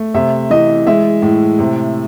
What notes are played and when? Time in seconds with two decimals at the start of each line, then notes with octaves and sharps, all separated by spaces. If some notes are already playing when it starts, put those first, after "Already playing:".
Already playing: A3
0.14 C3 E5
0.50 E3 D#5
0.87 G#3 E5
1.22 A2
1.59 C3